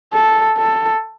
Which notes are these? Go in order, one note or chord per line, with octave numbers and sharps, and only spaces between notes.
A4
A4